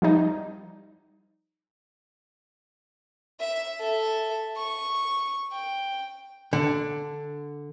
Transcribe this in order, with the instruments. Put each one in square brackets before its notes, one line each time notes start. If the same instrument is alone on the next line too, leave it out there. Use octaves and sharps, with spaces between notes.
[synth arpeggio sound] F3 G3 D#4
[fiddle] E5
A4 E5
C#6
G5
[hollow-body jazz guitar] D3